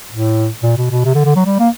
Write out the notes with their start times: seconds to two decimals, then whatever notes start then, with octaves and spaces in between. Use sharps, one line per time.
0.11 A2
0.63 A#2
0.77 B2
0.91 B2
1.04 C3
1.14 D3
1.25 D3
1.36 F#3
1.45 G3
1.59 A#3